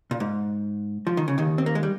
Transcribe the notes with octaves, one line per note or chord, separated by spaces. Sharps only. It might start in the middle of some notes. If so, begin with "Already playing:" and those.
A#2
G#2
F3
D#3
C#3
D#2 D#3
C4
A#3
G#3
G3